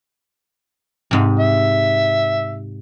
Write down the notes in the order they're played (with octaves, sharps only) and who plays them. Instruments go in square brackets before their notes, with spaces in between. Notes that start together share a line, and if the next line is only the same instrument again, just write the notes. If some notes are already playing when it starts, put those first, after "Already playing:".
[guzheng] G#2 C3
[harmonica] E5